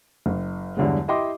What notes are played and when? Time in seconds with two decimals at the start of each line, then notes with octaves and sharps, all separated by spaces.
0.26 F#1
0.77 E2 G2 D3 F#3 G#3
1.08 E4 G4 D#5 G5 C6 D6